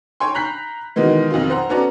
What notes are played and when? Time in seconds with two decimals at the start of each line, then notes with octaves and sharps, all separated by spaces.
0.20 C#5 G5 G#5 C6
0.35 A#5 B5 F#6 G6 B6 C7
0.96 B2 D#3 E3 G#3 B3
1.31 B1 F2 D#3 F3 F4
1.50 C5 F#5 A#5
1.69 B3 C#4 F#4 A4 D5 A#5